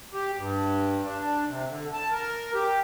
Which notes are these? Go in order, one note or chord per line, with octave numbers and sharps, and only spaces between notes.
G4
G2
D4
C3
D3
A5
A#4
G4